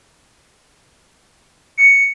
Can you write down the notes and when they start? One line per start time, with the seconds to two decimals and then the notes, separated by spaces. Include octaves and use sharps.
1.78 C#7